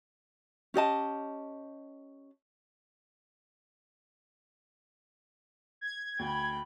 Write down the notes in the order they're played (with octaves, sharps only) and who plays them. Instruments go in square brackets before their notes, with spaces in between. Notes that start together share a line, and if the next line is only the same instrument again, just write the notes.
[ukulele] C#4 G4 D#5 A5
[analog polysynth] G#6
[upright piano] D2 [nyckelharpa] G5 B5